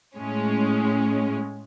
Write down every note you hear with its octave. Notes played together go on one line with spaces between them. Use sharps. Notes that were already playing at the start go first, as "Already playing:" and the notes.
A2 G#3 C#4